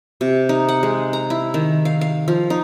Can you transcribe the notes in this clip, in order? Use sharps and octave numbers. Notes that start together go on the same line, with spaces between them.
C3
D#4
F#5
G#3
A#5
E4
D#3
F5
F5
F3
D#4